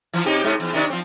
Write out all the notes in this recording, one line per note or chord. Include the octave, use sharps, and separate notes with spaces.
E3 F3
C3 D#4 G4
G#2 C3
E2
C3 D#3 D4
F3 C4